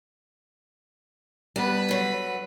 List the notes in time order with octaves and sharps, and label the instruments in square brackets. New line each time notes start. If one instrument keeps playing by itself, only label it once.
[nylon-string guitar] G3 B3 [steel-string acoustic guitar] D4 [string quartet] B4
[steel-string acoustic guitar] D3 F#3